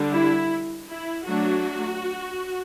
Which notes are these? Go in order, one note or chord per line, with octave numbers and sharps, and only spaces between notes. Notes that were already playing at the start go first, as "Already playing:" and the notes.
Already playing: D3 G3 D4
E4
E4
F#3 A3 D4 F#4